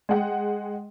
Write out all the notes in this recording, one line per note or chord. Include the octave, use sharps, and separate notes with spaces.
G#3 F#5 G5